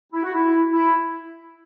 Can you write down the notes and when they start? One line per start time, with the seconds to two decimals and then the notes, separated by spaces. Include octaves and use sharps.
0.13 E4
0.24 F#4
0.34 E4
0.72 E4